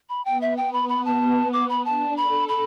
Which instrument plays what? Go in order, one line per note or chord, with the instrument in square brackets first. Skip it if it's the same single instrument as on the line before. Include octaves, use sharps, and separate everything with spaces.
[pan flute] B5
[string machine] B3 [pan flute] G5
[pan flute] E5
[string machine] B3 [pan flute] G5
[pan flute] B5
B5
A5
D6
B5
[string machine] D4 [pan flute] A5
[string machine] A4 [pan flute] B5
[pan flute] B5